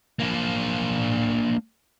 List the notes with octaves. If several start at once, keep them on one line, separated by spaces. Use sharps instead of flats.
A#3 D4